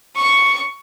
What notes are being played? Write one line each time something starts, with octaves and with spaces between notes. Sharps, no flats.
C#6